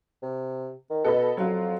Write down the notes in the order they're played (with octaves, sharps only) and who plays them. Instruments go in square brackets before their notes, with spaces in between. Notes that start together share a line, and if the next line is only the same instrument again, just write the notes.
[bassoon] C3
D#3
[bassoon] B2 [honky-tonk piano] A4 D#5 B5
[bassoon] F2 [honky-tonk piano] F#3 F4